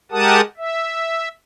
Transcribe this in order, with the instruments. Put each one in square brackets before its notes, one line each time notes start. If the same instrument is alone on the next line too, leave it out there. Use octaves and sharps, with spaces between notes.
[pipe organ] G#3 G4 A#4 F#5 A5 D#6
E5